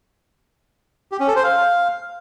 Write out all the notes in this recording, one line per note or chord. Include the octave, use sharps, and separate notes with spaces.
G4
C#4
A4
C5
F5